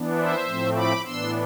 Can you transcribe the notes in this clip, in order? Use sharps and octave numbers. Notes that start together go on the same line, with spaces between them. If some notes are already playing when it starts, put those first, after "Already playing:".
Already playing: E3 B3 D4
C5 E5
A2 F3 A3 C4
B5 D6
A2 E3 B3 D4 C6 E6